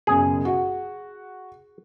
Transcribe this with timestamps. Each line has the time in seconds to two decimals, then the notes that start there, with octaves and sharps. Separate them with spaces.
0.07 F#1 F#2 B2 G#4
0.45 F#4 F#5